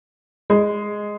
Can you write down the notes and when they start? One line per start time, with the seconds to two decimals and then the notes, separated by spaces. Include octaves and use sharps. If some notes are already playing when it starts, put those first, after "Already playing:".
0.50 G#3